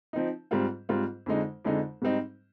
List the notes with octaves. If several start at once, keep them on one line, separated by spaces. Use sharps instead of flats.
F3 C4 D#4
G#2 G3 C4 F4
G#2 G3 C4 F4
F2 D3 G#3 D#4
F2 D3 G#3 D#4
G#2 G3 C4 D#4